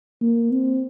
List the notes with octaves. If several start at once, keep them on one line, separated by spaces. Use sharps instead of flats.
A#3
C4